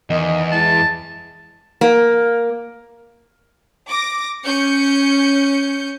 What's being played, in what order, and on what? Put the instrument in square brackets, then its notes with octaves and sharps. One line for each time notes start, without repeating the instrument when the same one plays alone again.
[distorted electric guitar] E2 [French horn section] D#3 D#5
[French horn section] G#3 E4 [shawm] A5
[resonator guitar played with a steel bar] A#3
[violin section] D6 A#6
C#4 G6 C#7